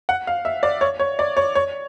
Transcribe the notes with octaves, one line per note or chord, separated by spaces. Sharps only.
F#5
F5
E5
D5
C#5
C#5
D5
C#5
C#5